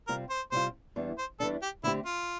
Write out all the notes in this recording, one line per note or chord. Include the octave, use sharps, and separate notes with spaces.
C3 G3 C4 F4 A#4
C5
C3 G3 C4 F4 C5
E2 E3 G3 D4
C5
E2 E3 G3 D4 A4
G4
D3 A3 C4 E4 G4
F4